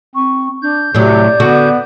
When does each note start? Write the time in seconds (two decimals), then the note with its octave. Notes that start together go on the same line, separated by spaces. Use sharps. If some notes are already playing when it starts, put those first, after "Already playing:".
0.15 C4 C#6
0.62 D4 G6
0.94 A2 C3 F#3 D5
1.40 D3 B3 F#4